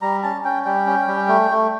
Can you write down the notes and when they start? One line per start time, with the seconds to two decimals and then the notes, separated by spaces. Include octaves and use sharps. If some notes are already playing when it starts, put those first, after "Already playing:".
0.02 G3 A#5
0.23 C#4 A5
0.44 C#4 G5
0.65 G3 G5
0.86 C#4
1.07 G3
1.28 A3
1.51 A3